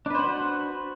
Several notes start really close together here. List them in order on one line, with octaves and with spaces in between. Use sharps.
D4 B4 C5 F#5 F#4